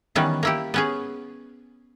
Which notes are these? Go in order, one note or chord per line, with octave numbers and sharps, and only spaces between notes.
D#3 E3 G3 B3 C#4
A#3 E4 G4
B3 C#4 G#4